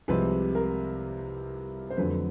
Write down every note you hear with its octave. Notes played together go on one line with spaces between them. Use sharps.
C2 C3 F3 G#3 C4 B4
A#4
C5
F2 D3 F#3 A3 B4